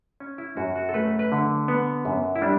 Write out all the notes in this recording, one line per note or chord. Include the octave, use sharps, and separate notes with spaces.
C#4
E4
F#2 F#4
F#4
A4
A3 B4
B4
D3
B3
F#2
E4
G3 D4